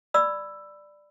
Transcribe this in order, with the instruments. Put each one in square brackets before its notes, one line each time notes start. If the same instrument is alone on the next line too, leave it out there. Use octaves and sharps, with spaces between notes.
[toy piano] D5 B5 E6